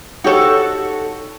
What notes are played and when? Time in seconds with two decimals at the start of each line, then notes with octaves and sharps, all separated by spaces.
0.24 D#4 F#4 G4 A4 C#5